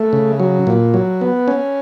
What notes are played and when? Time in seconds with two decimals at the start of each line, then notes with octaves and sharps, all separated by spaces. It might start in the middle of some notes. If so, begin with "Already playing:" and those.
Already playing: A3
0.13 C#3
0.40 F#3
0.67 A#2
0.94 F#3
1.21 B3
1.48 C#4